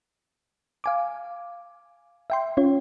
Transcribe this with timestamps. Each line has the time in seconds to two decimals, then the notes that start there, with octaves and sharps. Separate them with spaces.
0.84 F5 G#5 D6
2.30 E5 G5 C6
2.57 C#4 F4 C#5